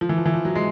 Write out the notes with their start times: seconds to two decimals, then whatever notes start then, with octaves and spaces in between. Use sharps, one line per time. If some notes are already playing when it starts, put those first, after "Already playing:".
0.01 F3
0.09 E3
0.17 F3
0.26 E3
0.34 F3
0.45 F#3
0.55 G#3